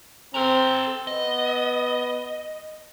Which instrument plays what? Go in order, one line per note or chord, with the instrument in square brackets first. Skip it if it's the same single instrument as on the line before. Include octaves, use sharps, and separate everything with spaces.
[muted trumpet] C4 [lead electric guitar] A4 A#5
[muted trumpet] B3 [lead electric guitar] D#5